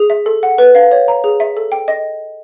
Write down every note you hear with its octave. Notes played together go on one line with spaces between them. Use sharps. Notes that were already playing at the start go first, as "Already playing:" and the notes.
Already playing: G#4
E5
A4
F#5
B4
F5
C#5
A#5
G#4
E5
A4
G5
D#5